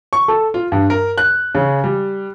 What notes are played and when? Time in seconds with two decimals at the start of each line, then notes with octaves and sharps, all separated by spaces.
0.13 C#6
0.28 A4
0.54 F4
0.72 G2
0.90 A#4
1.18 F#6
1.55 C#3
1.84 G3